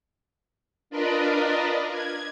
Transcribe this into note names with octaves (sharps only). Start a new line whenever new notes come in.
D4 F4 A#4 B4 D5 D#5
G#6